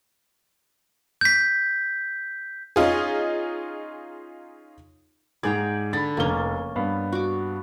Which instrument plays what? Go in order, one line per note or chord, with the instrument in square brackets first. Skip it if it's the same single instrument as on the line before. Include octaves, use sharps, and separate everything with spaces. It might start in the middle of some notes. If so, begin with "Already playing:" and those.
[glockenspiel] G6 B6
[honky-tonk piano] C#4 D#4 F4 G#4
[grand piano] G#2 G#4 G#6 [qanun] D5 G5 A#5
[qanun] D3 [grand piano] B5 A6
[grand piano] F1 G7 [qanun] A#3 C#4
[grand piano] G2 B3 F5
[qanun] F#4 D6